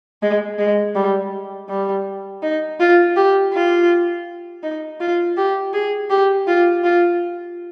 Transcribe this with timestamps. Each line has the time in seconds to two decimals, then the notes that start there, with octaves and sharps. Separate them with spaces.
0.22 G#3
0.58 G#3
0.95 G3
1.69 G3
2.42 D#4
2.80 F4
3.16 G4
3.53 F4
4.63 D#4
5.00 F4
5.37 G4
5.73 G#4
6.10 G4
6.47 F4
6.84 F4